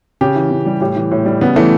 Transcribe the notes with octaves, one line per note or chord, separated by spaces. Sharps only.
C#3 G4
E3
C#3
G3
A2 G4
E3
A2
G3
C#3 B3
E3 A3